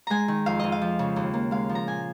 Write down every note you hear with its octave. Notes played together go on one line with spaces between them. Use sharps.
G#3 G#5 A#5
D#3
F2 F5
F2 D#5
F5
F3
C#3
D#2
A#3
G#3 F5
F3
A#5
A#2 G#5